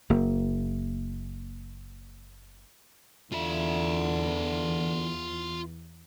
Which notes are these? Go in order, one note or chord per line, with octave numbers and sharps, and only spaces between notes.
F#1 A#3
E2 D3 F4 E5